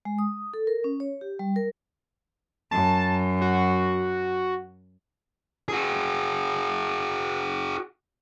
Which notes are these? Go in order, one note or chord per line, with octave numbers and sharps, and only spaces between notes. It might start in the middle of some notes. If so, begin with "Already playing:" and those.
G#3
D#6
A4
A#4
C#4
C#5
G4
G3
A#4
F#2 A5
F#4
F#4 G#4